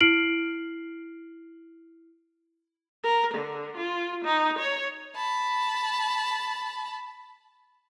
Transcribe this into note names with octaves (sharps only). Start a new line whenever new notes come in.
E4 F6 C7 D7 F#7
A#4
D3
F4
D#4
C#5
A5 B5